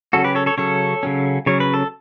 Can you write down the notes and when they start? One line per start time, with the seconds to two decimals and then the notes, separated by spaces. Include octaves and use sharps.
0.13 C#3 F#3 C#4 F#4 A4
0.24 G4 B4
0.35 A4 C#5
0.46 A4 C#5
0.58 C#3 F#3 C#4 A4 C#5
1.03 C#3 F#3 C#4
1.46 C#3 F#3 C#4 C#5
1.60 B4
1.74 A4